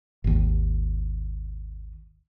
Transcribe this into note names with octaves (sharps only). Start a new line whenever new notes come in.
G#1 D#2